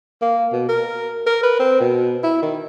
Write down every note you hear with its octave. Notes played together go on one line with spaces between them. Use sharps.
A#3
B2
A#4
A#4
B4
C4
B2
E4
D#3